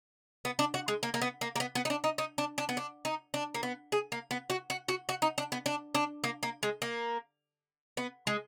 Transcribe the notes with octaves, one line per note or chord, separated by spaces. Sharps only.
B3
D4
F#4
G#3
A#3
A#3
B3
A#3
A#3
B3
B3
D#4
D4
D#4
D#4
D4
D4
B3
D4
D#4
D4
A#3
B3
G#4
A#3
B3
F#4
F#4
F#4
F#4
D#4
D4
B3
D4
D4
A#3
A#3
G#3
A#3
B3
G#3